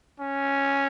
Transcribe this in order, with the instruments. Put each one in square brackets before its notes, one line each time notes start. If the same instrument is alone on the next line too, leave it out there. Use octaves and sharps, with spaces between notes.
[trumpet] C#4